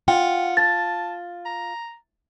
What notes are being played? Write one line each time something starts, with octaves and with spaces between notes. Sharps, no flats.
F4 F#5 G5
A5 A6
A#5